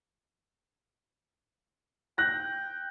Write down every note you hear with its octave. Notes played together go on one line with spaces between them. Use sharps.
G5 F#6 A#6